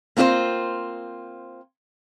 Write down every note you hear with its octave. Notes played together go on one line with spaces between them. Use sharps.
A#3 C4 F4 F#4 C5